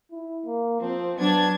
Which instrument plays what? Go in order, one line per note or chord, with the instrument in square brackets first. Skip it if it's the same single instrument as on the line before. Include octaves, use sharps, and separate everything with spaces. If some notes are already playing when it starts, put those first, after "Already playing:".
[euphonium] E4
A#3
[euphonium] F3 [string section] C4
[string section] F#3 D4 G#6 [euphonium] B3